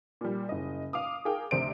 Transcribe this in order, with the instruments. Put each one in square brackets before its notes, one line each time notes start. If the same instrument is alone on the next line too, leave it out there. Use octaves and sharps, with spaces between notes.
[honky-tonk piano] A#2 G3
F#1 D#5
F5 D6 D#6
G#4 A#4 F5 G5
D2 C3 C5 D5 D7